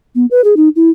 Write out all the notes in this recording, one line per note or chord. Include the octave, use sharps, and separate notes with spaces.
B3
B4
G#4
D#4
E4